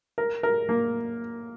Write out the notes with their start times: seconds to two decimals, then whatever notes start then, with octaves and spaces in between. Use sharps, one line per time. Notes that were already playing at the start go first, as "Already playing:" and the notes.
0.18 A#4
0.43 A#4
0.69 A#3